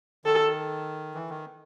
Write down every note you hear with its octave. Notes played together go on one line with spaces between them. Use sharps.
D#3 A4
E3
D#3